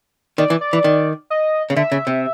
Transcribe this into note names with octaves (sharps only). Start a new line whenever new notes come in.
D#3 D5
E3
D5
E3
D#3
D#5
C#3
D3 E5
C#3
C3